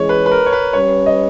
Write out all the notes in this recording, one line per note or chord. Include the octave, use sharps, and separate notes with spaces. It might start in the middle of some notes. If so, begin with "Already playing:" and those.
Already playing: E3 G#3 C#4 G#4 C#5
B4
B4
A#4
C#5
B4
G3 C#4 G4 B4 C#5
D#5